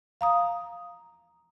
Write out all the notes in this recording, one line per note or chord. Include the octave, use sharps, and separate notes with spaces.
F5 A#5 D#6